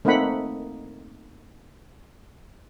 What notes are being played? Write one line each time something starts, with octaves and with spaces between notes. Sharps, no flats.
A3 A#3 C4 D#4 F#5 B5